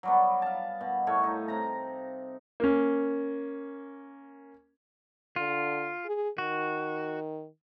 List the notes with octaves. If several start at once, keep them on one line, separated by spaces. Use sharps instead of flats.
F#3 G3 B3
F5 A5
B2
A2 A3 C#5
D#4
C3 A#5
A#3 C#4
D3 F4
G#4
D#3 F#4